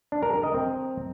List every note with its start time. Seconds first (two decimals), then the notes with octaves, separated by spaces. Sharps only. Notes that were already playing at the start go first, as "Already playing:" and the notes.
0.12 D4
0.23 A#4
0.33 A#4
0.44 D#5
0.54 C4